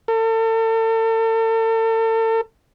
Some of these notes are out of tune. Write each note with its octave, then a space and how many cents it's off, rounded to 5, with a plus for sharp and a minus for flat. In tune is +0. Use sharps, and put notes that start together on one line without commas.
A4 +40